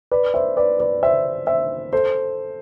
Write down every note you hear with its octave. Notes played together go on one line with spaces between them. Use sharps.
B4 D5
C5 E5
B4 D5
B4 D5
C5 E5
C5 E5
A4 C5